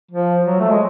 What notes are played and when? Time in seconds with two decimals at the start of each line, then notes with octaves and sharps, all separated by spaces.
0.11 F3
0.46 F#3
0.60 A3
0.69 G#3